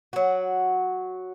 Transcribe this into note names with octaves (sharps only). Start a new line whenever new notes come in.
F#3 F#4